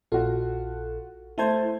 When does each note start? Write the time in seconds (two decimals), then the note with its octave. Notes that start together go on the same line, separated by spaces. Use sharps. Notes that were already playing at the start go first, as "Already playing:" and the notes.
0.12 A#1 F4 F#4 A4
1.38 A3 E4 C5 A5 G#6